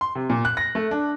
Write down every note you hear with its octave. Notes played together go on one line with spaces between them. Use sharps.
C6
C3
A#2
F#6
A#6
A3
D4